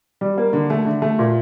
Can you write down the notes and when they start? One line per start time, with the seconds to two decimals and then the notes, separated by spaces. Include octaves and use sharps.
0.21 G3
0.38 A#3
0.53 D3
0.70 A3
0.85 D3
1.02 A3
1.19 A#2